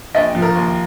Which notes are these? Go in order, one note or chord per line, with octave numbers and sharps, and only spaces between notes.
A#1 D#5 G5
F3
A#4
D#2